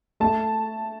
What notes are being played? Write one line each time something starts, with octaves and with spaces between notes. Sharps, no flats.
A3 A5